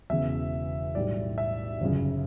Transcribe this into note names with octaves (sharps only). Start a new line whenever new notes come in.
E1 E2 C#3 E5
B1 A2 G3 D5
E5
G1 F#2 C#3